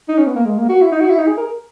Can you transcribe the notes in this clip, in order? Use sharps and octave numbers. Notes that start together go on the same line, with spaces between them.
D#4
C#4
B3
A#3
G#3
A#3
F#4
E4
D#4
F#4
E4
D#4
G#4
A#4